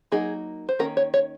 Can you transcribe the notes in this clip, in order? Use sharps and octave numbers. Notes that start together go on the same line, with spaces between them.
F#3 A#3 D#4 G#4
C5
D#3 A#3 C#4 A#4
C#5
C#5